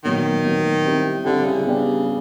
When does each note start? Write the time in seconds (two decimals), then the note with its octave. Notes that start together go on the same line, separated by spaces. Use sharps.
0.04 A#2 D#3 F#3 B3
0.45 A#2 F#3 B3
0.85 G3 C4 E4 G4
1.25 D3 G3 C4 E4 G4
1.45 C#3
1.65 G3 B3 D4 G4
2.05 G3